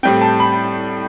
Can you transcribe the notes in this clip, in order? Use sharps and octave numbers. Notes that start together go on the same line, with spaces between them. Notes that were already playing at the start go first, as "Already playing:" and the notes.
A2 G3 C4 G5
A5
B5